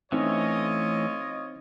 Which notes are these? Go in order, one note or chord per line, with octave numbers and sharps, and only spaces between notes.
E3 A3 C4 C#4 D#4 F4 C#5 D#5